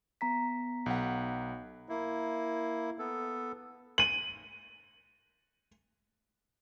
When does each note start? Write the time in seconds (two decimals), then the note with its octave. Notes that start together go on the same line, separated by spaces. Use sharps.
0.21 B3 A#5 B6
0.86 B1 F#5
1.89 A#3 E4
2.99 B3 A4
3.98 D#7 F#7